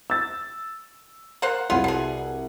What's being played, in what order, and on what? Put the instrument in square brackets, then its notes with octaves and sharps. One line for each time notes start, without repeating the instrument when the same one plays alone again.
[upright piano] E6 A6
[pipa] A#3 C5 F#5
[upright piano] C2 F#5 [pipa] B3 F4 G#4
[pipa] B2 G#4